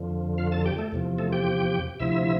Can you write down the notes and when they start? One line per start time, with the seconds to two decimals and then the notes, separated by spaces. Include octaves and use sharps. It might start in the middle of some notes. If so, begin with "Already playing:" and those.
Already playing: F2 D3 F3
0.38 F4 F5
0.52 A4 A5
0.65 G4 G5
0.78 A3 A4
0.92 E2 C3 F3
1.19 A3 A4
1.32 G4 G5
2.00 D2 C3 F3 E4 E5